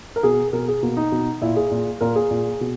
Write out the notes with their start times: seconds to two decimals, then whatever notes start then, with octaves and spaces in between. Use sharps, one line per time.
0.16 A#4
0.23 B2 G#4
0.53 B2 A#4
0.68 G#4
0.83 B2 A#3
0.97 D#4
1.12 B2
1.42 A#2 E4
1.56 G#4
1.71 A#2
2.01 A#2 A#4
2.16 G#4
2.31 A#2
2.61 B2